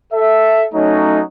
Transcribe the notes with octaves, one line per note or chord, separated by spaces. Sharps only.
A4 E5
F#3 A3 C#4 D#4